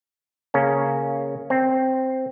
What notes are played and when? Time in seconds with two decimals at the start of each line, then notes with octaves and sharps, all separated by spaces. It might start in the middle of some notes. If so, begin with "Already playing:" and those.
0.54 C#3 A#3 C#4
1.50 C4